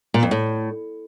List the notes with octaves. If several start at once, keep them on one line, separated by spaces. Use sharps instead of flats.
A#2
F2
A2